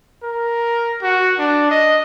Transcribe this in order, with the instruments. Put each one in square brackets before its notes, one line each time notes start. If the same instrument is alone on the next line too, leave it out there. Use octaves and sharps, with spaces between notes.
[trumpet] A#4
F#4
D4
D#5